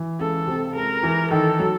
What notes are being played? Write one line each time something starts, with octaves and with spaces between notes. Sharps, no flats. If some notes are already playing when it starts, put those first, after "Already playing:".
Already playing: E3
C#2 A4
C3
G#3 A#4
E3
D#3 A4
F#3